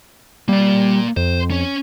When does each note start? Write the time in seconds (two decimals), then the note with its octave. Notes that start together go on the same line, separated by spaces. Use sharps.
0.49 G3 A#3 D5
1.17 F2 C5
1.50 C#4 C#5